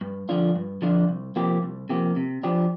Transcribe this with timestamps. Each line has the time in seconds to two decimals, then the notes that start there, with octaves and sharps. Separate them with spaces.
0.01 G2
0.29 D3 F3 D4 F4
0.56 G2
0.82 D3 F3 D4 F4
1.09 C2
1.36 C3 F3 A#3 G4
1.63 C2
1.89 C3 F3 A#3 G4
2.16 C3
2.43 F3 D4 G4